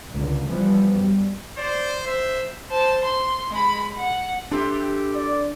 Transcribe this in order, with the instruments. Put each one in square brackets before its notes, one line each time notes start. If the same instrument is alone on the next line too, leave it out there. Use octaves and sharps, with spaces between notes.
[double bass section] C#2 A#2 D3
E3 F3 G3 B3
F#2 G3
[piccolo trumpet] C5 [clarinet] D5
[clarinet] C5 [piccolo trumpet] E5
[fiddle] C5 A5
C6
G#3 B5
F#5
[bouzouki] E3 C4 A4 [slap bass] D4 [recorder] G4
[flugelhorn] D5